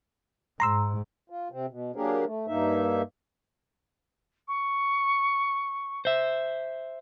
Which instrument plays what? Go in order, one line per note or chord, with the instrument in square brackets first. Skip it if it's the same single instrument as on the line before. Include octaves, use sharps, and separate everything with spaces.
[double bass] G#2 [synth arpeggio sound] A#5 C6 E6
[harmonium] F4
C3 C4
B2
F#3 A#3 D4 G4 G#4 A#4
A3
G2 A#3 D#4 E5
[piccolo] C#6
[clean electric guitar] C5 E5